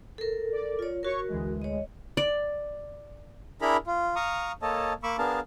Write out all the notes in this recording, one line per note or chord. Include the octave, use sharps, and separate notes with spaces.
A4 A#4
D5
F4 C#5
F#4 A#4 C#5 C#6
D2 E3 G#3
C#5 D#5
D5
D4 E4 G#4 A#4 A#5 B5
F4
F5 A#5 C#6 D#6
A#3 A4 C#5 D#5 A5
A#3 B5 C#6 D6 E6
B3 D4 G#4 A#4 F5 A5